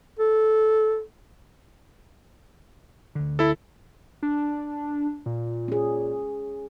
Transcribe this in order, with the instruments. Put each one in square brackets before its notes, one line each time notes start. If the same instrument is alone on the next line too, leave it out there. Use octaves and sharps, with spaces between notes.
[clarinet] A4
[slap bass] D2 D3
[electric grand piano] E4 A4
[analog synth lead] D4
A#2
[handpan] C#4 G#4